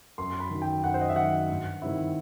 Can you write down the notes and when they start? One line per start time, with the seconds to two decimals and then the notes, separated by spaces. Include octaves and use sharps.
0.18 F#2 C6
0.40 B5
0.51 D#3 F#3
0.62 G5
0.84 F#2 F#5
0.94 C5
1.01 D#5
1.09 E5
1.16 D#3 F#3 F#5
1.49 G2
1.82 D#3 G3 C4 E4